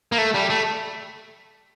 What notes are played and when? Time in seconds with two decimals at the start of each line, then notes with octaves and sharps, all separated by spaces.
0.12 A#3
0.18 A3
0.34 G3
0.50 A3